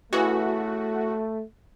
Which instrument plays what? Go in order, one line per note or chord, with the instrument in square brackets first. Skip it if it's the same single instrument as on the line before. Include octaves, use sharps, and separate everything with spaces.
[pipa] C#3 E3 B3 [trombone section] A3 [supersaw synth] F#4